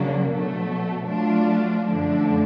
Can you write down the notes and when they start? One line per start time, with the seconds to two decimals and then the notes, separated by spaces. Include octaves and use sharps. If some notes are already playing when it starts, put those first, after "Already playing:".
Already playing: C#3 F#3 A#3 D4
0.31 B2 F#3 A3
1.10 F#3 A3 D4 F4
1.87 F#2 D3 F3 A3 D4